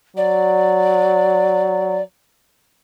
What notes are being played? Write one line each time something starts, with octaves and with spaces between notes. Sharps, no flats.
F#3 D5